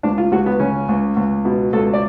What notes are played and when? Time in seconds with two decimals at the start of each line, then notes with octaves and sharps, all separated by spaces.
0.03 C#2 D4
0.18 F4
0.31 C#2 F#4
0.46 B3
0.60 C#3 C#4
0.89 C#2
1.16 C#2
1.45 B2
1.73 C#2 A4
1.93 D5